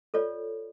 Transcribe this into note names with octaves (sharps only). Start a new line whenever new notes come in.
F4 A4 C#5 D5